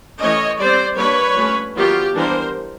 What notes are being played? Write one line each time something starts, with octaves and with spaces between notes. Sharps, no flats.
E3 A3 C#4 C#5 D#5
G3 C4 C5 D5
G3 A#3 D4 B4 C#5
F3 A3 C#4
D#3 F#3 B3 F4 G4
E3 G3 B3 D4 A#4 C5